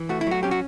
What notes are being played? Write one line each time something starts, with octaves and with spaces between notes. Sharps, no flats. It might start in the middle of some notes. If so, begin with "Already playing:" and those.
Already playing: E3
A3 F#4
E4
F#3 F#4
C#4 G4
F#4